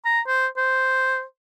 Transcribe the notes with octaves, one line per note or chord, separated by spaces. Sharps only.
A#5
C5
C5